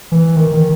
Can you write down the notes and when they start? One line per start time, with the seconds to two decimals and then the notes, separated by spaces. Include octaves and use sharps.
0.12 E3
0.36 D#3
0.52 D#3